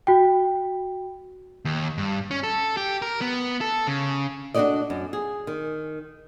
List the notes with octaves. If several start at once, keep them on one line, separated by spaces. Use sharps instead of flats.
F#4 G5
D#2
G2
C#4
A4
G4
A#4
B3
A4
C#3
D4 F#4 G4 A4 D5 D#5
F#2
G#4
D#3